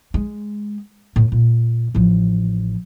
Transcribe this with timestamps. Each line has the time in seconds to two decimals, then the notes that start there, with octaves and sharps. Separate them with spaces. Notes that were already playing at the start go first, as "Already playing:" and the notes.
0.14 G#3
1.16 A2
1.32 A#2
1.95 A1 F3